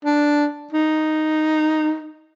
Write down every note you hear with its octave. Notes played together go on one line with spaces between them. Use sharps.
D4
D#4